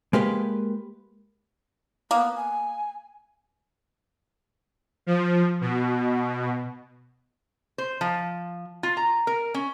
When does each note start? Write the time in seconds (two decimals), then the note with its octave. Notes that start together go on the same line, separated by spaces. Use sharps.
0.13 G#3 A#3 G4 B4
2.11 A#3 B3
2.36 G#5
5.07 F3
5.61 B2
7.78 C5
8.01 F3
8.83 F4
8.97 A#5
9.27 A#4
9.54 C#4